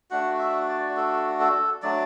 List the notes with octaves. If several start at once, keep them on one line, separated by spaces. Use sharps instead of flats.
A3 D4 F#4 F#5
E5
D5
A4
A4
F#3 A3 D4 D5